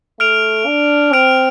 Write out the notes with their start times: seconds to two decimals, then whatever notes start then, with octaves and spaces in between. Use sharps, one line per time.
0.20 A3 F6 D7 F7
0.67 D4
1.13 C4 F6 D7 F7